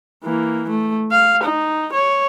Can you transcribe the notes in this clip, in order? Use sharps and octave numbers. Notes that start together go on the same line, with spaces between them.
E3 A#3
A3
F5
D#4
C#5